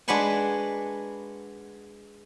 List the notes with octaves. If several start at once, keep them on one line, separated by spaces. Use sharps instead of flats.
G#3 D4 F#4 B4 F#5 G#5